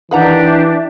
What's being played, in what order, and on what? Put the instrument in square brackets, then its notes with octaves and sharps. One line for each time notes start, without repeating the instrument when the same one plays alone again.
[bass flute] D#3 [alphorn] E3 [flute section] D4 G4 [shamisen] B4 F#5 A#5
[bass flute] E5